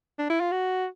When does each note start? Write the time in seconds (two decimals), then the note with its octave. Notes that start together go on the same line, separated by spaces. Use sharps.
0.19 D4
0.30 E4
0.41 F4
0.52 F#4